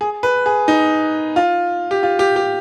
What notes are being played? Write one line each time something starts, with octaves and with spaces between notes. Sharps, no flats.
G#4
B4
G#4
D#4
F4
G4
F4
G4
G4